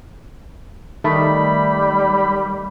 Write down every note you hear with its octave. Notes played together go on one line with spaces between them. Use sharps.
D#3 G3 A3 B5